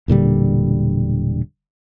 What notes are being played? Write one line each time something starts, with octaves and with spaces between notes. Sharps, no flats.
E1 A#2 D3 G3